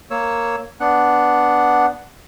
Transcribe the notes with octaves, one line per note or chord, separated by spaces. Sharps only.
A#3 C#5 E6
B3 D4 F#5